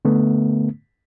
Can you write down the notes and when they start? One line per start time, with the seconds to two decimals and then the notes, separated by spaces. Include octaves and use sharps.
0.05 D3 A3 B3